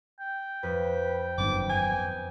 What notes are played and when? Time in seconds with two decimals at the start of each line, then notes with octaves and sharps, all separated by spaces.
0.20 G5
0.63 F2 B4
1.38 G1 F#2 D#3 B3 C4 D6
1.70 G#5 D#6 D7